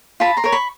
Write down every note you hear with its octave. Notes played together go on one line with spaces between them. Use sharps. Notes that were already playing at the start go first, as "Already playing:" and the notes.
F4 A5 B5
A#5 C6
A#4 C#5
B5 C#6